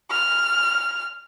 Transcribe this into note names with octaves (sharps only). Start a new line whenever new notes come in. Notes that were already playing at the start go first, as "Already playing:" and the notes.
F6